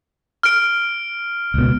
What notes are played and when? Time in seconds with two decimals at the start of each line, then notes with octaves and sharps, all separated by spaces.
0.43 F6 D7
1.54 C#2 B2